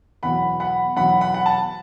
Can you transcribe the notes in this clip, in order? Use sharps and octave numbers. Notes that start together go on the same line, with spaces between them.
E2 B2 F#3 F#5 B5
F#5 B5
E2 B2 F#3 F#5 B5
F#5 B5
F#5
A5